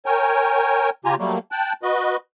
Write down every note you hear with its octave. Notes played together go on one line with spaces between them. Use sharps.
A#4 C#5 G5 G#5
C#3 F4 G4 G#5 A#5
F#3 G3 A3 A#3
G5 A5 F#6
F#4 B4 D#5